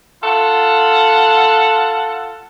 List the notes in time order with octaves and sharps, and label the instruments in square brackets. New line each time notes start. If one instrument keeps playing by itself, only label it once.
[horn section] F4 A4 F#5